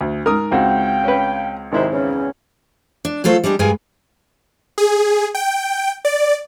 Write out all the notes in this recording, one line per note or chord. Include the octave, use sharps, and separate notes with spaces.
D2
G#2 A#4 D#6 F6
C#2 C4 F#4 F5 G5
C#4 B4
G#1 C3 D#3 G#3 E4 C5
E2 C#3 C#4
D4
F#3 A3 F4 A4 C5
G3 G#3 D4 G4
G2 G#3 A#4 B4 G#5
G#4
G5
D5